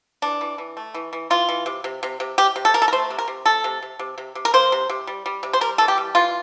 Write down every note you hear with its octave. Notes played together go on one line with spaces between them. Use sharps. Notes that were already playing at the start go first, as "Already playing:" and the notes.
E3 D4
E3
E3
A3
E3
E3
E3 F4
E3
C3
C3
C3
C3
C3 G4
C3
A4
C3 A#4
A4
A#4
A3 C5
C3
A#4
C3
A3 A4
C3
C3
C3
C3
C3
A#4
A#3 C5
C3
C3
G3
G3
C3
C5
G3 A#4
E3 A4
G4
G3
E3 F4